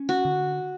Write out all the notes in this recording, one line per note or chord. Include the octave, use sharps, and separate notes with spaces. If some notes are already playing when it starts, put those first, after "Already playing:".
Already playing: C#4
F#4
D3